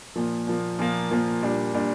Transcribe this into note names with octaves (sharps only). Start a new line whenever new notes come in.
A#2 F3 A#3
A#2 F3 A#3
A#2 F3 A#3
A#2 F3 A#3
A#2 G3 D4
A#2 G3 D4